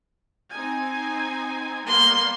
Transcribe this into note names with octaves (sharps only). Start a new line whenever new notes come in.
C4 D#4 G#5
G3 A#3 B3 C6